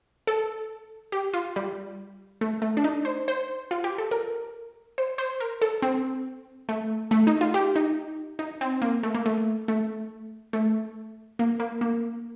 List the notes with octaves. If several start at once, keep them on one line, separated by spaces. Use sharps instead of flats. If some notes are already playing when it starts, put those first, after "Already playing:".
A4
G4
F4
G3
A3
A3
D4
D#4
C5
C5
F4
G4
A4
A#4
C5
C5
A#4
A4
C4
A3
A3
D#4
F4
G4
D#4
D#4
C4
A#3
A3
A#3
A3
A3
A3
A#3
A#3
A#3